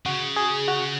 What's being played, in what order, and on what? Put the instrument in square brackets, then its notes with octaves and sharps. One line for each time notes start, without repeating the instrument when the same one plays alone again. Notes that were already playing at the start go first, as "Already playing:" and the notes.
[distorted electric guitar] C#3 [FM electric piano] F#4
[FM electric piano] G#4
F#4